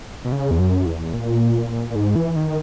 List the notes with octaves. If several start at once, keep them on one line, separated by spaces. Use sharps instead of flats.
B2
C#3
E2
F#2
E2
A#2
A#2
G#2
E3
D#3